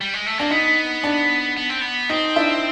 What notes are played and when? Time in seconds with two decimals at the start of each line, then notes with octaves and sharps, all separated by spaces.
0.01 G3
0.14 G#3
0.26 A3
0.38 A#3 D4
0.50 B3 D#4
1.04 D4
1.57 B3
1.69 C4
1.81 B3
2.09 C4 D#4
2.36 D4 E4